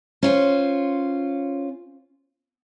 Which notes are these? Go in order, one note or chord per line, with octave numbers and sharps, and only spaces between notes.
C#4 F4 C5